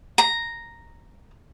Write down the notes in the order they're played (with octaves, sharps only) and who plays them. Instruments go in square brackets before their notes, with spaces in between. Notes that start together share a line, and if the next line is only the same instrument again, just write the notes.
[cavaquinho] A#5